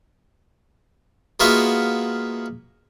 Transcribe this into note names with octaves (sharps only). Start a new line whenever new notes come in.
G#3 A#3 B3 F4 F#4 E5